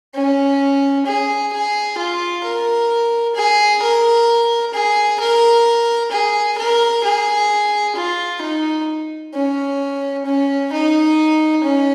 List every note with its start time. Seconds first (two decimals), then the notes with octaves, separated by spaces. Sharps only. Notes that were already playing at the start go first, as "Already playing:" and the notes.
0.15 C#4
1.06 G#4
1.53 G#4
1.98 F4
2.44 A#4
3.36 G#4
3.82 A#4
4.74 G#4
5.20 A#4
6.12 G#4
6.58 A#4
7.04 G#4
7.96 F4
8.42 D#4
9.34 C#4
10.26 C#4
10.72 D#4
11.64 C#4